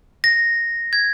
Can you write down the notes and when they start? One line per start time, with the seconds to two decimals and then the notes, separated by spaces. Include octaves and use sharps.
0.24 A#6
0.93 G#6